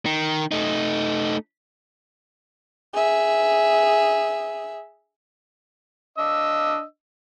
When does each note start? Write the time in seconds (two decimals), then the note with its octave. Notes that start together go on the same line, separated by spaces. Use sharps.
0.06 D#3
0.52 A3 D#4
2.94 G#4 E5
6.18 D4 D#5 E6